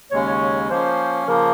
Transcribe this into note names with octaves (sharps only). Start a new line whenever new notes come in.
D#2 C#3 G#3 C#4 C#5
C#5
F3 A#3 C#4 C5
C#3 F3 A#3 A#4